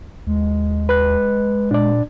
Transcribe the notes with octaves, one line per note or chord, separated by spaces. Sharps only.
D#2 G#3
B4 F#6
A#2 D4 D5